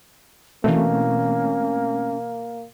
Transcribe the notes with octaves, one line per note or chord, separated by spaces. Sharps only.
B2 E3 A3 A#3 C4 C#4